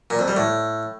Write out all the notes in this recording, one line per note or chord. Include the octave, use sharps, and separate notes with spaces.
A#2
F2
G3
A2